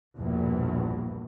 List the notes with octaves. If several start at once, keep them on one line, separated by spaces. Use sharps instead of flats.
A#1 E2 G2 B2